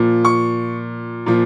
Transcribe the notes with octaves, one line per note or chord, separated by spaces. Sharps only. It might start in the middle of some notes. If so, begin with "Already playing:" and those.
Already playing: A#2 F3
C#6
A#2 F3